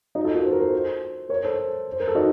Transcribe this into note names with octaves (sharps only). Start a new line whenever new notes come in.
D#4 F#4
F4 A4
F#4 A#4
C5
A#4
A4 C5
A#4 C#5
A4 C5
C5
A#4
A4
D#4 F#4